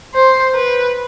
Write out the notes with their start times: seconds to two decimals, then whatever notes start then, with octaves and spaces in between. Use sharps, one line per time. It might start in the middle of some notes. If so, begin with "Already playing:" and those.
0.15 C5
0.55 B4